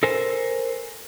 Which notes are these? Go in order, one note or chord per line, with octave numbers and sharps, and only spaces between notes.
A4 A#4 C5 G#5